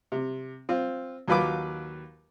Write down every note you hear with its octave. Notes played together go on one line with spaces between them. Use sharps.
C3
C4 F4
D#2 F#3 F4 B4 B5 D6